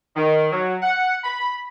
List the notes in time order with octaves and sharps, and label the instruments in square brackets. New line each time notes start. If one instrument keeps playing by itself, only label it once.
[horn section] D#3
F#3
F#5
B5